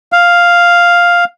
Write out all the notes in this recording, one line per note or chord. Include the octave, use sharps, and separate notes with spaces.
F5